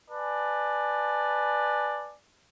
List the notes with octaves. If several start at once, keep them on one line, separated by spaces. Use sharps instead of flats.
B4 D5 G#5 A5